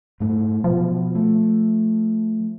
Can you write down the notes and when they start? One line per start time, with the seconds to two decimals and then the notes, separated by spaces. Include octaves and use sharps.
0.20 G#2 A3
0.64 B2 F3
1.15 A3